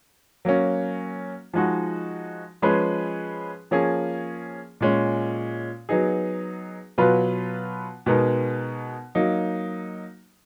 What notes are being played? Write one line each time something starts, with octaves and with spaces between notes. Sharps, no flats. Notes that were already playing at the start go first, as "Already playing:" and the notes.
F#3 A#3 C#4
F3 G#3 D#4 F#4
F3 G#3 C#4 G#4 B4
F3 A#3 C#4 G#4
A#2 G#3 C#4
F#3 B3 D#4 G#4
B2 F#3 B3 F4 B4
B2 G#3 B3 D#4 A#4
F#3 A#3 D#4